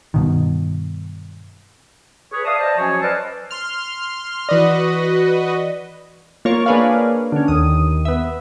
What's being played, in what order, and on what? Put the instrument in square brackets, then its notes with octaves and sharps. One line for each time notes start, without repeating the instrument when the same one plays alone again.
[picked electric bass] G2 B2 D#3
[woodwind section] G#4 B4 C#5
D5 E5 F5 A5 D#6
C5 D5 D#5 A5
F3 F#3 C#4 F#4 G#4 C#5
B4 C5 D5 D#5 F5 A5
[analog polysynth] C6 F6
[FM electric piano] E3 D5 [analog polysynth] F#4 B4 D#5
[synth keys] A#3 F4 C#5
A#3 D4 G#4 B4 C#5 F5
D3 C#4
D#2 D#6
B3 E5